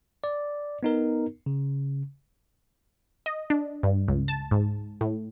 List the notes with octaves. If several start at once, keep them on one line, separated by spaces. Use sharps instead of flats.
D5
B3 D#4 A#4
C#3
D#5
D4
G2
C#2
A5
G#2
A2